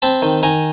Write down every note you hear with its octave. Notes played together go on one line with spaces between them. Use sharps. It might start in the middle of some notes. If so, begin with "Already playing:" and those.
C4 A5 B5
D#3
D#3 G#5 A#5